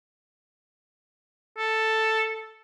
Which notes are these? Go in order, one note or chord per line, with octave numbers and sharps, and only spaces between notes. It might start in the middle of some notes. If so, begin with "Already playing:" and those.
A4